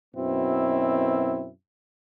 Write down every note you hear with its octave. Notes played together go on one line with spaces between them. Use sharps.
F#2 B2 B3 C4 E4